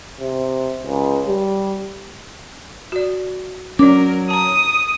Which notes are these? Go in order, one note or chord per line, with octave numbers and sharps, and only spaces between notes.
C3
C#2
G3
F#4 D5
F#3 C#4 A#4 D5 D6
A5 A#5 D#6